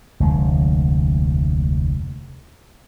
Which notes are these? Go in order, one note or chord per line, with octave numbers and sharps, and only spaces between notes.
F1 D2 G#3